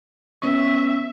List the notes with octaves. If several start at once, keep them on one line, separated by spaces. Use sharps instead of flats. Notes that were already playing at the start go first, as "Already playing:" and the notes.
B3 C#4 E5 C#6